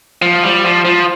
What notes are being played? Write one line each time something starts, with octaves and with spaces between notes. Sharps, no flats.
F3
G3
F3
F3